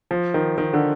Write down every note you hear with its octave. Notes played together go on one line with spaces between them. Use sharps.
F3
D#3
D#3
D3